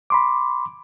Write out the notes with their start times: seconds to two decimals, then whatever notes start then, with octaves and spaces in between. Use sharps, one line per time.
0.10 B5 C6 D6